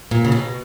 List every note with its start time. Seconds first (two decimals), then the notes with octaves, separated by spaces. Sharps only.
0.11 A#2
0.25 C#3
0.32 B2